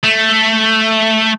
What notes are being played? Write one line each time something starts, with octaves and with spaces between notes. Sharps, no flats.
A3